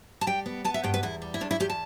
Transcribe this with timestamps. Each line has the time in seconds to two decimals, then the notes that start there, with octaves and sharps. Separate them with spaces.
0.21 A5
0.27 G3 G5
0.46 B3
0.64 B3 A5
0.74 E5
0.84 G2 G5
0.94 B4
1.03 E2 E4
1.22 G3
1.34 E4
1.41 E2 D4
1.51 E4
1.60 E2 G4
1.70 A5